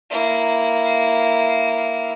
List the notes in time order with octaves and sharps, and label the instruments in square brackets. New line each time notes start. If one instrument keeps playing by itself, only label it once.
[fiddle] A#3 E4